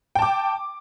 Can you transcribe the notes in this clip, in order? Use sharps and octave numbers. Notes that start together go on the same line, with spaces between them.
G5 A5 D6